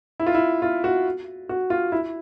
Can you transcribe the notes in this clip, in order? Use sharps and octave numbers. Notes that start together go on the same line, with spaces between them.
E4
F4
E4
F4
F#4
F#4
F4
E4